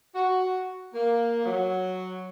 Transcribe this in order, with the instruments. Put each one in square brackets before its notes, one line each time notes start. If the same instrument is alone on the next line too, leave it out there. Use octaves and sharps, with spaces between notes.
[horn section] F#4
A#3
F#3